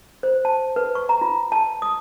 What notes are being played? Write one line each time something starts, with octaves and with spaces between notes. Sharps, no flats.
C5
A5
B4
C#6
A#5
F4
A5
D#6